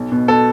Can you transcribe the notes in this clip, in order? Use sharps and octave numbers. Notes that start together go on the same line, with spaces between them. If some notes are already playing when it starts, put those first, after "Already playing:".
Already playing: B1
B2
B2 A4